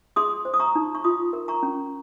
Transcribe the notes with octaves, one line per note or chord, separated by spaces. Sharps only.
G#4 C6 D#6
C5
D#6
A#5 C#6
D#4
C#6
F4 C6 D#6
A#4
A#5 C#6
C#4